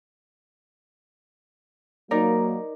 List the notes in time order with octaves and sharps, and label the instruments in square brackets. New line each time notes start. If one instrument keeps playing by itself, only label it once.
[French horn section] F#3 A#3 [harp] D#4 A#4 D5